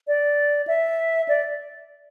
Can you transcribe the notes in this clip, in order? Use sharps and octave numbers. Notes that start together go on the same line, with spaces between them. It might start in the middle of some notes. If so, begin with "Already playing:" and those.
D5
E5
D5